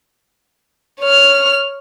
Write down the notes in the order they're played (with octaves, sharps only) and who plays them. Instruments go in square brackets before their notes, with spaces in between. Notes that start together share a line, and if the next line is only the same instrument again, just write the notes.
[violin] C#5 F6